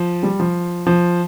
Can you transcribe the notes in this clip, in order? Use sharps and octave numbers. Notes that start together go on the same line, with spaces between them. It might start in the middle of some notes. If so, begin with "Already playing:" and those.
Already playing: F3
G3
F3
F3